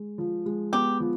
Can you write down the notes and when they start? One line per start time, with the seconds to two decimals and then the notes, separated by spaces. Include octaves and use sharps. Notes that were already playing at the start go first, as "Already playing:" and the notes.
Already playing: G#3
0.18 F3
0.46 G#3
0.73 B3 G4
1.00 F3